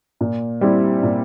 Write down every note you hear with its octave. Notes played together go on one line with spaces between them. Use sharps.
A#2
G3 C4 E4 G4
A#2